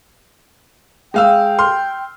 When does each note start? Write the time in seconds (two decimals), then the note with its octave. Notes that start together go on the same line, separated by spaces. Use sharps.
1.14 G#3 F5 G5 E6
1.59 C6 F6